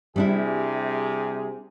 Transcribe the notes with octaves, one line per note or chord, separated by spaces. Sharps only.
C3 G3 D4 E4 G#4